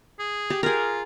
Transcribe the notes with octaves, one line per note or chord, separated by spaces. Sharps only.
G#4
G4
F4 G#4 A#4